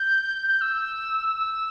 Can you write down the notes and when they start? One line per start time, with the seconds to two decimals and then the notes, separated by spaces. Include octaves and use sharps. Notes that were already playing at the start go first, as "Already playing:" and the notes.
Already playing: G6
0.47 G6
0.61 E6
1.36 E6